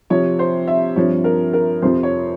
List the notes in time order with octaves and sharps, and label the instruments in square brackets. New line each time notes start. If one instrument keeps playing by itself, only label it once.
[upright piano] C3 F3 C4 C#5
C5
E5
G2 F3 C4 C#5
A#4
A#4
F2 C3 F3 C5
C#5